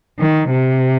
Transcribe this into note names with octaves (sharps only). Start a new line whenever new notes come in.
D#3
C3